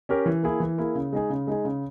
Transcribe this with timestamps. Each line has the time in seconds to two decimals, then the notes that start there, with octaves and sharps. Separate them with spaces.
0.09 C#4 G4 A#4
0.26 E3
0.43 A#3 E4 G#4
0.60 E3
0.78 A#3 E4 G#4
0.95 C#3
1.13 G#3 D#4 G#4
1.30 C#3
1.47 G#3 D#4 G#4
1.65 C#3